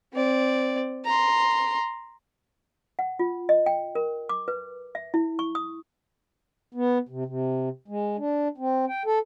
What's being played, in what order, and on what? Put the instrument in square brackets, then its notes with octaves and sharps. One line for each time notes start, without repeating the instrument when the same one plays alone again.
[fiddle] C4 D5
A#5 C6
[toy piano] F#5
F4
D#5
G5
A#4
D6
B4
E5
E4
C#6
D#6
[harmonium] B3
C3
C3
G#3
D4
C4
G5
A4